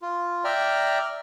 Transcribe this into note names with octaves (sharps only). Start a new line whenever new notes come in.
F4
D5 E5 G5 A#5 F6